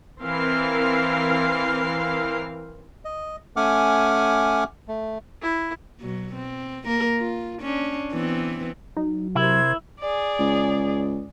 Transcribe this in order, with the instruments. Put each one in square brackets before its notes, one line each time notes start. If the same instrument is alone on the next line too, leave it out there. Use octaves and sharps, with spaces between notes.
[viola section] E3 C4 A#4 F5
[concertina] D#5
A3 C#4 F#5 G#5 D6 F6
A3
[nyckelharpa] E4
[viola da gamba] B2 F#3
C4
A#3 A#4
F4
C#4 D4
E3 B3 C4
[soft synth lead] F#3 [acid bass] D#4
[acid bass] C3 [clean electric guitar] E4 [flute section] A#4 C5 G#6
[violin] G#4 D5
[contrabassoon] C#2